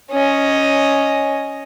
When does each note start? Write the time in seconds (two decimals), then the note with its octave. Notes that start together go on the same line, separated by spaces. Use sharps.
0.11 C#4 D#5